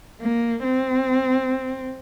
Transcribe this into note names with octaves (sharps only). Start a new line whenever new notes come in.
A#3
C4